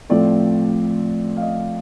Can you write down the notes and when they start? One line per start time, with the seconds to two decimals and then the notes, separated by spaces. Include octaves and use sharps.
0.10 A2 F3 A3 C4 D5
1.37 F5
1.41 D#5